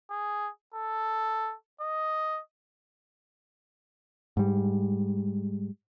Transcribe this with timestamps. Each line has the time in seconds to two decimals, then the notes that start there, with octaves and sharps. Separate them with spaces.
0.10 G#4
0.74 A4
1.81 D#5
4.37 G#2 G3